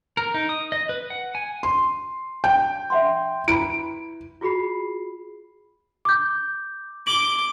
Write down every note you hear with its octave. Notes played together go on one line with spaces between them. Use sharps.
A#4
D#4
D#6
D#5
B4
F#5
G#5
C6
G5
E5 F#5 C6
E4 B4 B5 D7
F4 F#4 G#4 B5 C7
D6 G6
D6 F#7 G7